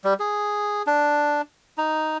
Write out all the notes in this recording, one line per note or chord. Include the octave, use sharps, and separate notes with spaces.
G3
G#4
D4
D#4